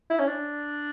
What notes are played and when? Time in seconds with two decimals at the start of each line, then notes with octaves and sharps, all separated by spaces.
0.10 E4
0.19 C#4
0.27 D4